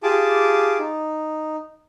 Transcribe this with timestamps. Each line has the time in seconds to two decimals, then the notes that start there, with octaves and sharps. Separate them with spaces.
0.03 F4 G4 G#4 A5 D6
0.79 D#4